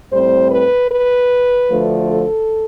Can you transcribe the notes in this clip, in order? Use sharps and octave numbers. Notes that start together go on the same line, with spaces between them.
A2 G3 C4 C5
B4
B4
D2 D3 F3 A3
A4